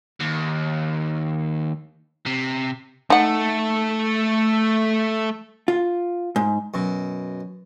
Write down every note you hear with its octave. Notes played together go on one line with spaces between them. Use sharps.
D#2
C3
A3 D#4 F#5
F4
G#2
F#2 B2